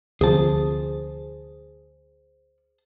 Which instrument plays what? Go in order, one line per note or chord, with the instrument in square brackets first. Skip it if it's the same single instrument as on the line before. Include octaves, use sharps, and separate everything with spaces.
[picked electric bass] D2 C3 F3 [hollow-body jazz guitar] G#4 C5 A5